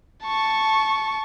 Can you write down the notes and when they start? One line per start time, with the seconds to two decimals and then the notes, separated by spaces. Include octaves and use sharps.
0.24 A5 C#6